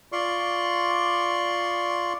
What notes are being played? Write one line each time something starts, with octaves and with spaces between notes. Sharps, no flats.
F4 D5 C6 C#6